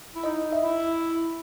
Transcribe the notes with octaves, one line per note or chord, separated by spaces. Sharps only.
E4
D#4 D#5
D#4
E5
E4